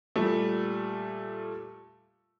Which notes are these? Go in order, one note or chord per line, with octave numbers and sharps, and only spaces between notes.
A#2 G3 A3